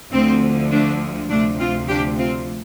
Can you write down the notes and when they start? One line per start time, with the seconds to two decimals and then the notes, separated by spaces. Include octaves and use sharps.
0.12 D2 D3 F3 C4
0.71 A3 D4
1.30 D2 C3 F3 A3 D4
1.59 C4 F4
1.89 D4 G4
2.18 C4 F4